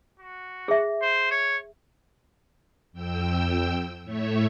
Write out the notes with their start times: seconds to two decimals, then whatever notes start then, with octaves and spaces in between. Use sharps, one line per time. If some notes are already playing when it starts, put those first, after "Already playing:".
0.19 F#4
0.68 G#4 E5
1.02 C5
1.31 C#5
2.93 F2 G5 E6
4.04 A2 A3 C#5 E5